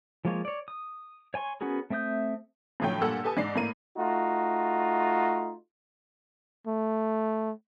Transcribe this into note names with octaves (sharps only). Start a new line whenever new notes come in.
F3 G#3 A#3 F4 C#5
C#5 D5
D#6
C#5 G#5 C6 C#6
B3 C#4 F#4 G#4 A#4
A3 C4 E5 D#6 G6
A2 D3 F3 F#3 A3 G5
G2 A#2 G4 A4 F#5 E6
G4 A4 B4 G#5 A5 D#6
G#2 D5 C7
A2 A#3 D#7
A3 D#4 F4 F#4
A3